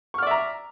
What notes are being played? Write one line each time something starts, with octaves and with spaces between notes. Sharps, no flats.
D5 E5 A#5 C#6 F6